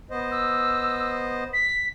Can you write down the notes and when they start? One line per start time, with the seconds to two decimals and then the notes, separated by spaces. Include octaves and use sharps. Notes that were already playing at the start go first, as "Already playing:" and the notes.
0.11 B3 C5 D#5
0.31 E6
1.53 B6